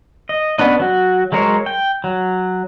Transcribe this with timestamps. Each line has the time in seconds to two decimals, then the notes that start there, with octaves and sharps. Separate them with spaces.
0.29 D#5
0.58 B3 C#4 D4 D#5
0.80 F#3 F#4
1.32 F#3 G#3 A#4 C5 C#5
1.66 G5
2.04 F#3